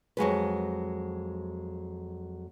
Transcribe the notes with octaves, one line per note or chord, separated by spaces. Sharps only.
F2 F#3 G#3 B4